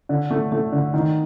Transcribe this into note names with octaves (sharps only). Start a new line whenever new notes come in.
D3
A3
A3
D3
D#3